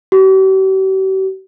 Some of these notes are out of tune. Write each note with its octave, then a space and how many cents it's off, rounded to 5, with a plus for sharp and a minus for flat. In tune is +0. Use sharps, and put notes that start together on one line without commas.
G4 -45